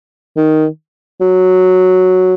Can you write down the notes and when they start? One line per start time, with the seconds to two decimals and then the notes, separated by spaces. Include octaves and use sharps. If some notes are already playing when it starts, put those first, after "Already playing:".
0.37 D#3
1.21 F#3